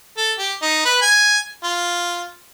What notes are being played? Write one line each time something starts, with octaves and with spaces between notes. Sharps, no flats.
A4
G4
D#4
B4
G#5
F4